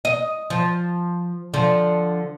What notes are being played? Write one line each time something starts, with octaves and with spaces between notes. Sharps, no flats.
D#5
F3
D3 F3